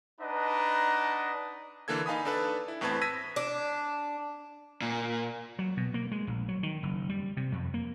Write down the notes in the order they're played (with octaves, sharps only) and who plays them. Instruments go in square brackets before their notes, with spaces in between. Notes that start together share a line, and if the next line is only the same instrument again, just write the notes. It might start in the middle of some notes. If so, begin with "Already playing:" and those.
[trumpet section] D4 D#4 B4 D#5 F#5 A#5
[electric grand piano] D3 E3 A#3 A4 G#6
D#4 F5 G#5 B5 D#6
D4 A4 B4
E4
E2 A2 C4 B4 A5 G#6
E6 G#6 A#6 B6 D#7
[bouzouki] D4
[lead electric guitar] A#2
[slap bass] F#3
B2
A#3
G#3
A#1
F#3
D#3
F#1
G3
C3
F2
A#3